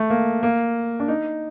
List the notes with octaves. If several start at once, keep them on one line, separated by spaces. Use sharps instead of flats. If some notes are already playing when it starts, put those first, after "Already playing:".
Already playing: A3
A#3
A#3
D4
D#4